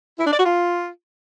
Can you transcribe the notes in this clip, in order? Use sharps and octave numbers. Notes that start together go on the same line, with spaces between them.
E4
D4
D5
F#4
F4